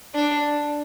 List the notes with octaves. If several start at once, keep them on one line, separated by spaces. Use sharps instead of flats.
D4